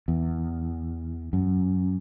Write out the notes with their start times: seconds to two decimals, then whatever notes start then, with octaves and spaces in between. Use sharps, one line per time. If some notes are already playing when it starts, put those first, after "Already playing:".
0.08 E2
1.33 F#2